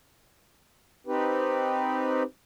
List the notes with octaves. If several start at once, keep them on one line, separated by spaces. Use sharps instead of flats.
C4 D#4 G4 B4